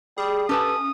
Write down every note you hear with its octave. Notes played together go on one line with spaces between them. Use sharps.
G3 G#4
C#4 G4 A4 B4 A5 D#6